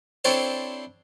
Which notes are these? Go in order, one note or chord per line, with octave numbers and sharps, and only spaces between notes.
C4 D4 E4 A4 C5 C#5